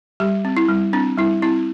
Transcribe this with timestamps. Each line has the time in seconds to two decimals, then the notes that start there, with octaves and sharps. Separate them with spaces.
0.20 G3 G4
0.45 C4
0.57 E4
0.69 G3
0.93 C4 D4
1.18 G3 E4
1.42 C4 E4